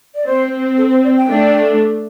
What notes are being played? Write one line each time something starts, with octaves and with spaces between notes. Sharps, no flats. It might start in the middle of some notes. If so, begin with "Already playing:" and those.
D5
C4 C5
A4
C5
D5
G5
A3 D4